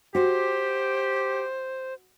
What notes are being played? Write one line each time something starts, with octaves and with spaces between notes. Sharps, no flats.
F#4 G4 C5